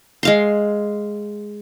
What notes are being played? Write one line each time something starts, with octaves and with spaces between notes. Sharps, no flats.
G#3 F5 C6